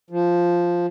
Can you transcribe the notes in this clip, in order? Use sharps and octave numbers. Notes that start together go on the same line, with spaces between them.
F3